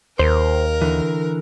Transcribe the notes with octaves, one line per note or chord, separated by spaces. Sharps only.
D#2 A#4 C5
D3 E3